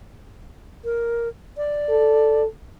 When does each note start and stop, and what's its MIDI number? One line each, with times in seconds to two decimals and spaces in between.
0.85 1.28 70
1.57 2.42 74
1.90 2.46 69